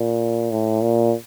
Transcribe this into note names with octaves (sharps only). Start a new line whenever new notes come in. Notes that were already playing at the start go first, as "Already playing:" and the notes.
Already playing: A#2
A2
A#2